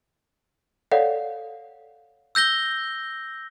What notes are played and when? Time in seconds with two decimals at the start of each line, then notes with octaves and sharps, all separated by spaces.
0.92 A4 C#5 D5 F5 F#5
2.35 E6 G6 A#6 G7